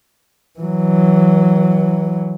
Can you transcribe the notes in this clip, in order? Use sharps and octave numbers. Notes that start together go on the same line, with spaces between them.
E3 F#3